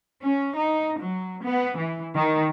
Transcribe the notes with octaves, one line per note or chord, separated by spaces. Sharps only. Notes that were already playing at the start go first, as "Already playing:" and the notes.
C#4
D#4
F#3
B3
E3
D#3